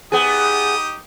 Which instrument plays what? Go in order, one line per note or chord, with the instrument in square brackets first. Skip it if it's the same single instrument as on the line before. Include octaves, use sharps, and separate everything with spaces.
[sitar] B3 G#4 [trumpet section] D#4 G4 D#6